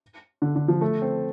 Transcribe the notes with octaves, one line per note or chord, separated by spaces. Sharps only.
D3
D3
F3
A3
C4